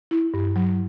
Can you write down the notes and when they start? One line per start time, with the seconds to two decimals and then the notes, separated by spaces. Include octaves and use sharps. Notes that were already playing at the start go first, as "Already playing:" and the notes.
0.11 E4
0.34 G2
0.56 F#3